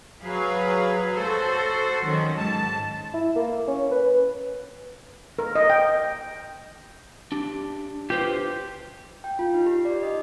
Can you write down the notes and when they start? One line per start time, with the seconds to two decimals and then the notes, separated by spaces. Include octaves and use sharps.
0.24 F#3 G#4 B4 F5
1.16 F#4 A4 C5
2.05 D#3 F#3 C#4
2.38 G#2 A5
3.14 E4
3.36 A#3
3.68 C#4
3.91 B4
5.39 A#4
5.55 D#5
5.70 G5
7.32 D4 G4
8.10 F4 G4 B4 C5
9.24 G5
9.39 F4
9.54 D#4
9.66 G4
9.85 D5
10.03 D#5